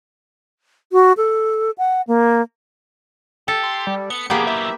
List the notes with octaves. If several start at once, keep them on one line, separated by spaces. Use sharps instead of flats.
F#4
A4
F#5
A#3
G4 A4
C6
G3
B3 C#7
C2 F2 A#3 B3 G4 G#4
F#3 E4 E5